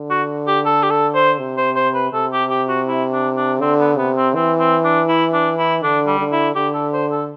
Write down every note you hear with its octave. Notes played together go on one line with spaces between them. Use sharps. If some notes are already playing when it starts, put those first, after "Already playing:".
Already playing: D3
F#4
G4
A4
G4
A4
C5
C3
C5
C5
B4
C3 A4
G4
G4
F#4
E4
D4
D4
D3 C4
B3
C3 B3
C4
E3 C4
C4
D4
E4
D4
E4
D3 D4
G3
D3
E4
D3 G4
A4
C5
A4